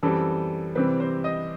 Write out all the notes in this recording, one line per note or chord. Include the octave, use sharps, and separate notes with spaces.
F#2 E3 G3 C4 A4
C3 E3 G3 C4 B4
C5
D#5